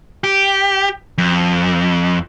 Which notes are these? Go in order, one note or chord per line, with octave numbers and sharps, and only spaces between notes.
G4
F2